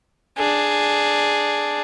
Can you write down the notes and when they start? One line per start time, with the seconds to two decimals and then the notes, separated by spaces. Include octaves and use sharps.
0.38 D4 G#4